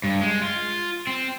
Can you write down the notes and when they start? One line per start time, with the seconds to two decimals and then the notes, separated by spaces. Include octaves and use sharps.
0.04 G2
0.22 G#3
0.42 F4
1.07 C4